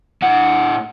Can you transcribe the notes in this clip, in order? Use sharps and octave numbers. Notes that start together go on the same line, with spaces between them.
A2 F#5